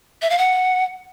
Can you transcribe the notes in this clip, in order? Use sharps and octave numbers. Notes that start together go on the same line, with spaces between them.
E5
F5
F#5